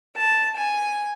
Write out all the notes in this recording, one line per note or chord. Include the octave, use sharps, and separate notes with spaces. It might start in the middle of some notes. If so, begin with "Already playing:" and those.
A5
G#5